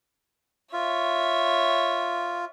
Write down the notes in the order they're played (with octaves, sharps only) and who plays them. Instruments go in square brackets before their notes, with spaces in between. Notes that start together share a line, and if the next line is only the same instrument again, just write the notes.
[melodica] F4 [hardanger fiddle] C#5 E5